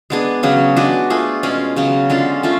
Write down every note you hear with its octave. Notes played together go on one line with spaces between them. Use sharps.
G#3 B3 D4 G#4
C#3 F#3 C#4 G#4
G#3 D4 F#4 B4
A3 F4 G#4
B2 G#3 C#4 G#4
C#3 F#3 B3
D3 G#3 C#4 F4
A3 C#4 F4